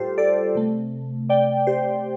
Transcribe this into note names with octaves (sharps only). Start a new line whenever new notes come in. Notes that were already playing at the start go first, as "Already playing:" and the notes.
Already playing: A2 G3 F4 G4 A4 C5
A4 D5
C3 A3
D5 G5
G4 C5